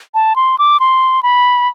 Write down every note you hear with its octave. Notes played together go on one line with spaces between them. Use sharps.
A5
C6
D6
C6
B5